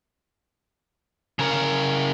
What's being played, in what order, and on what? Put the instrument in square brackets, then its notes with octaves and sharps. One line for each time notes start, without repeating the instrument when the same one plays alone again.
[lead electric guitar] C#3 A#4